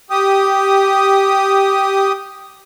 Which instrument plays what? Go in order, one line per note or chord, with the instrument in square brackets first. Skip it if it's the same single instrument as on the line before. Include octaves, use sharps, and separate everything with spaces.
[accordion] G4 D#6